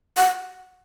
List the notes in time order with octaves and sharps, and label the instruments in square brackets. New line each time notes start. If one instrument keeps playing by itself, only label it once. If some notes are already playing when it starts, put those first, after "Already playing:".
[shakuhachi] F#5